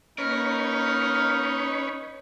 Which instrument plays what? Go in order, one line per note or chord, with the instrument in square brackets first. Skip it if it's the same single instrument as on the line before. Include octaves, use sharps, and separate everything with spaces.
[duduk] A#3 [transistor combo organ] C#4 B4 C#5 [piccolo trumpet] D#4 [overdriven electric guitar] A#4